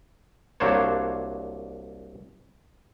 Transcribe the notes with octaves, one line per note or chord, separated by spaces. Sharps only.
C2 F#3 A#3 D4 C5 C#5